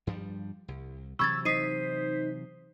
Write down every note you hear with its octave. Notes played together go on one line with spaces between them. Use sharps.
G2 F3 G3
C2
C3 E3 F#3 B5 C#6 E6 G#6 A6
D#4 C5 D#6 B6 C7 D#7